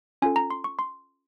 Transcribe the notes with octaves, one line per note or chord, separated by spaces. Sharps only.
C#4 F4 A4 G#5
A#5
C6
C#6
C6